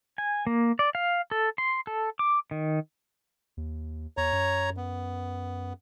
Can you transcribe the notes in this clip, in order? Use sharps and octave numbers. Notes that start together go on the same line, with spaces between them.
G#5
A#3
D5
F5
A4
C6
A4
D6
D#3
D#2
E2 C#5 A#5
F#2
B3